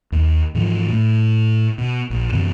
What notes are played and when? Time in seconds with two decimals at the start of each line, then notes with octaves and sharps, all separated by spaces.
0.12 D#2
0.55 G#2 E3 F3
0.90 A2
1.78 B2
2.10 A#1
2.32 F#2 C3 E3 B3